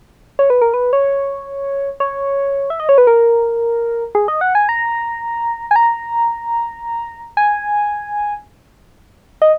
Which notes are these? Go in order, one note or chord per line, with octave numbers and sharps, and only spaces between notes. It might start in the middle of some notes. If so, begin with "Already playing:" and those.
C#5
B4
A#4
B4
C#5
C#5
E5
D#5
C#5
B4
A#4
G#4
D#5
F#5
G#5
A#5
G#5
A#5
G#5
D#5